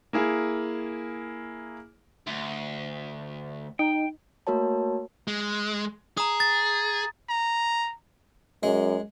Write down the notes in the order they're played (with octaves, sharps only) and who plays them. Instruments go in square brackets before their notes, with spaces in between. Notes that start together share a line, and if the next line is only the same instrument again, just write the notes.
[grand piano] A#3 E4 G#4
[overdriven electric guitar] D2
[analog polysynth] D#4 [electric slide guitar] G5
[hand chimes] A3 A#3 F#4 A#4 C#5 A5
[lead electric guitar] G#3
[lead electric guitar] G#4 [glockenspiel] A#5 D#6
[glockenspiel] A6
[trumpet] A#5
[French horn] F#2 [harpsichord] G#3